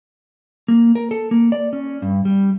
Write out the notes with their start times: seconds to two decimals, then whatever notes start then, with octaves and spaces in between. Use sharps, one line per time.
0.68 A#3
0.95 A#4
1.11 A4
1.31 A#3
1.52 D5
1.73 C#4
2.02 G2
2.25 G3